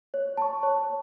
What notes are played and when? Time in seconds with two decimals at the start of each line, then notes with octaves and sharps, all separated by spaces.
0.14 C#5
0.37 A5 C#6
0.63 C#5